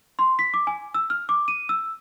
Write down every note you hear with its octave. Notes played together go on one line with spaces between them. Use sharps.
C6
B6
D6
G#5
E6
F6
D6
D#7
E6